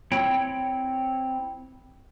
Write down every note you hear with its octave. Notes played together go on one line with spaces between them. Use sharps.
C4 E4 C#5 G5